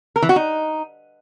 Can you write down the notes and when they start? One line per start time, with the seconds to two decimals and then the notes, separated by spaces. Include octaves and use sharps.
0.16 A#4
0.22 E3
0.29 F#4
0.36 D#4